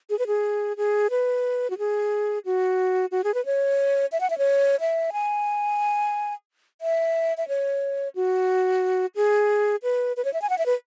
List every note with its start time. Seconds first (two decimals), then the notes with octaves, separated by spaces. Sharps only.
0.10 G#4
0.19 B4
0.27 G#4
0.77 G#4
1.10 B4
1.70 F#4
1.78 G#4
2.45 F#4
3.12 F#4
3.24 G#4
3.34 B4
3.46 C#5
4.12 E5
4.20 F#5
4.30 E5
4.38 C#5
4.80 E5
5.13 G#5
6.81 E5
7.37 E5
7.48 C#5
8.16 F#4
9.16 G#4
9.83 B4
10.17 B4
10.25 C#5
10.33 E5
10.42 G#5
10.50 F#5
10.58 E5
10.66 B4